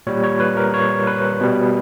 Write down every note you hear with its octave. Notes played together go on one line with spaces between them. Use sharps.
A#2 G3 C#5
C#5
B4
A#4
C#5
B4
B2 G3